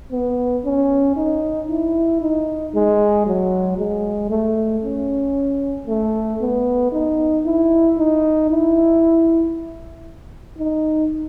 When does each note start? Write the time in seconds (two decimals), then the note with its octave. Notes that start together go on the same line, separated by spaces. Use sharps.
0.11 B3
0.65 C#4
1.16 D#4
1.70 E4
2.21 D#4
2.74 G#3
3.26 F#3
3.78 G#3
4.30 A3
4.83 C#4
5.87 A3
6.41 B3
6.92 D#4
7.45 E4
7.98 D#4
8.50 E4
10.59 D#4